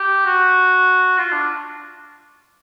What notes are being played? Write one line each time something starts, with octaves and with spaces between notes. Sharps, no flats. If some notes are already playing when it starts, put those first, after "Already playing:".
Already playing: G4
F#4
F4
D4